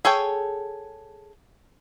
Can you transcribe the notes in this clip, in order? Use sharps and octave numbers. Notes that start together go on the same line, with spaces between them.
G#4 A4 C#5 G5